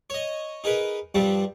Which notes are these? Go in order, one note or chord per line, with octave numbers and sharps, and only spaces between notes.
C#5 D#5
D#4 G#4 A#4 B4
G2 F3 G3 C4